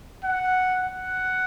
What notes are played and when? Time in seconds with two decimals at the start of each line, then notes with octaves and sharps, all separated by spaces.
0.24 F#5
0.81 F#5